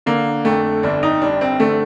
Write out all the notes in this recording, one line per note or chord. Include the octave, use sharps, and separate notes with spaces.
D3 A#3
F2 A3
G1 D4
D#4
G2 D4
C4
D3 A3